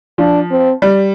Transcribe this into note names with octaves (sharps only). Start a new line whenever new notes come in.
F3 D4
C4
G3